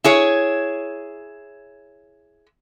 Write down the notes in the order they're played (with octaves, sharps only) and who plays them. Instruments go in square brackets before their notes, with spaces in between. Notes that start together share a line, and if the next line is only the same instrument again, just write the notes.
[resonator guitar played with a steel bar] E4 G#4 C#5